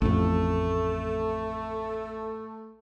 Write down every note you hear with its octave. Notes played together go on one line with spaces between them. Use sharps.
A1 F2 A3